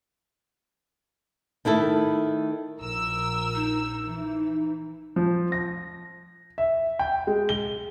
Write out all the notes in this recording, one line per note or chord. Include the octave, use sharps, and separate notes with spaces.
D#3 A3 E4 A4
A#1 A#4 E6
D#4
E3
F3
A#6
E5
G5
G#3
G7